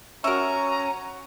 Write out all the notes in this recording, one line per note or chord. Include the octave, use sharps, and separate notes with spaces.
C#4 F#4 A#4 E5 A#5 C#6